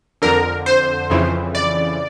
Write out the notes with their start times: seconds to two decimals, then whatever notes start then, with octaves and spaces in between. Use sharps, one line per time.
0.22 F2 D3 A#4
0.66 C5
1.10 F2 C#3 E3
1.55 D5